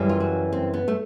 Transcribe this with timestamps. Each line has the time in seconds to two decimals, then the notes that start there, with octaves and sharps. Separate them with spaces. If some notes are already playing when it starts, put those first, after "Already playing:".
Already playing: F#2 C#3 E3 G3
0.09 F4
0.20 F#4
0.52 C4
0.74 B3
0.88 A3